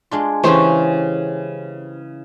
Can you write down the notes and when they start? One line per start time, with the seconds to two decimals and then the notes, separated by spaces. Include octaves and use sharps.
0.11 G#3 D4 F4
0.44 C#3 E3 C#4 G4 G#4 C5 C#5 G5